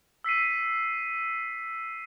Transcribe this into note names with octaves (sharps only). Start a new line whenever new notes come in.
E6 B6 C7 D#7